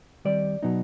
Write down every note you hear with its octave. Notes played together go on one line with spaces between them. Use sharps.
D#3 G3 C4 D5
B2 F#3 B3 D#4